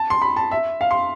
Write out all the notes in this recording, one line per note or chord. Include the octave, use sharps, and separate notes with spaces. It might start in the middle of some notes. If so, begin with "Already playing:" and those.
Already playing: A5
C6
B5
A5
E5
F5
C6